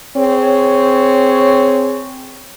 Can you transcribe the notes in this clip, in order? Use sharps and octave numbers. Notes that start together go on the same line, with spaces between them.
C4 G#4 C#5